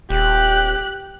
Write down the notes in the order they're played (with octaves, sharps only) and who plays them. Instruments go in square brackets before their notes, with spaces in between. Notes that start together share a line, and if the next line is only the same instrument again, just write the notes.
[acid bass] D#1 [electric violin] G4 F#6